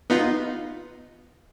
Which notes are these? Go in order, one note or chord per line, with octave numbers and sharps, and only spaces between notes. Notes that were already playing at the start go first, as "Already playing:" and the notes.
B3 D#4 F4